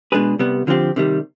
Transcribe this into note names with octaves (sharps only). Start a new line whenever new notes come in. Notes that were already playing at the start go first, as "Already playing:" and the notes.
B2 G#3 D4 G#4 B4
C2 C3 G3 B3
D3 F3 C4 G4
C3 D#3 G3